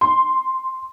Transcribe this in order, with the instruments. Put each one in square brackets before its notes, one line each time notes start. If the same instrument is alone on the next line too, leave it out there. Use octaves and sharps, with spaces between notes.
[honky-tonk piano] C6